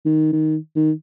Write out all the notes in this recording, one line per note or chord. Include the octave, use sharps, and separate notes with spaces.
D#3
D#3
D#3